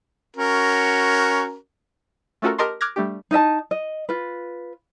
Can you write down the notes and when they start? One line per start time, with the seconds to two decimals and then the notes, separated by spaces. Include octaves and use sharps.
0.36 C#4 F#4 A#4
2.42 A3 C#4 F4 F#4 A4 A#4
2.58 G4 A#4 D#5 A5 C6
2.81 D6 F6 F#6 G#6 A#6
2.96 G3 A3 D4 G4
3.31 D#4 D#5 E5 A5
3.71 D#5
4.09 F4 B4